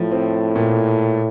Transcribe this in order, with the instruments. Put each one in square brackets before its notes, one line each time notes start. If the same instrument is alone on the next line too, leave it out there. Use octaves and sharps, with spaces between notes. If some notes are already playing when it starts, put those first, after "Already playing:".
Already playing: [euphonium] A2 [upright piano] F3
[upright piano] C4
A#2